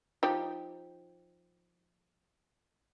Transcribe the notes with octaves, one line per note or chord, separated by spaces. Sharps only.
F3 D#4 G4